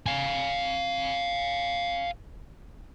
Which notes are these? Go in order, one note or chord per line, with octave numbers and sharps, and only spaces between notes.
F5 G#5